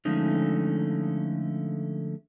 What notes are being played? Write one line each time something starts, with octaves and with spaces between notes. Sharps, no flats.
D3 F3 G#3 A3 C#4 D#4